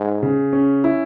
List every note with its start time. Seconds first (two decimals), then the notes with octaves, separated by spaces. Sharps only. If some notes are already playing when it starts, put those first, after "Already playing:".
Already playing: G#2
0.23 C#3
0.53 C#4
0.84 E4